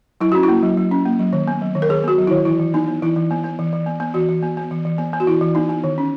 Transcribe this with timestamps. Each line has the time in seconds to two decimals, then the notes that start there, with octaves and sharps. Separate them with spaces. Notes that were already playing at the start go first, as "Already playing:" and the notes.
0.21 F#3 E4
0.32 C#4 F#4
0.43 A#3 E4
0.63 F#3
0.77 F#3
0.91 C#4
1.06 A#3
1.19 F#3
1.33 D#3
1.48 B3
1.61 F#3
1.75 D#3
1.82 A#4
1.89 D#3 G#4
2.04 B3 F#4
2.18 F#3
2.27 D#3 E4
2.45 E3 E4
2.59 E3
2.74 B3 D#4
2.88 B3
3.02 E3 E4
3.16 E3
3.31 B3
3.44 B3
3.59 E3
3.73 E3
3.86 B3
4.00 B3
4.14 E3 F#4
4.29 E3
4.42 B3
4.57 B3
4.71 E3
4.85 E3
4.98 B3
5.13 B3
5.20 F#4
5.27 E3 E4
5.41 E3
5.55 B3 D#4
5.69 B3
5.84 D#3
5.98 C#4